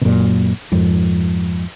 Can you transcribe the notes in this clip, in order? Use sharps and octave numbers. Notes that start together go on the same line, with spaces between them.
B2
F#2 A#2
F2 G#2